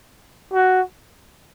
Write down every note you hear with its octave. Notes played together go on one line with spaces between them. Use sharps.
F#4